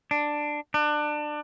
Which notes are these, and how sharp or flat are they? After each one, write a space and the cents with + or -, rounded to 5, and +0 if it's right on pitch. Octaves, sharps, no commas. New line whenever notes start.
D4 +10
D4 +25